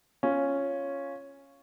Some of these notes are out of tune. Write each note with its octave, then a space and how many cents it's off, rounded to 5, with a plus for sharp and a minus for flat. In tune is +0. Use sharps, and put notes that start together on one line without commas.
C#4 +0 F4 +0